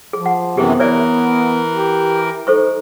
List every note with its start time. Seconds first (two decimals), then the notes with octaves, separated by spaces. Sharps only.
0.13 F3 G#4
0.26 F#5
0.57 F#2 C3 E3 B3 G4 G#4
0.80 E3 A#4 C#5 D5 E5
1.72 G4
2.47 D#4 A4 C5 C#6